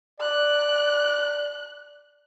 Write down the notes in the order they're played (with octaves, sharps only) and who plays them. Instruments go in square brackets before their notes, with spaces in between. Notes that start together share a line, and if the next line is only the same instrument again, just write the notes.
[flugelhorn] D5 [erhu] F#6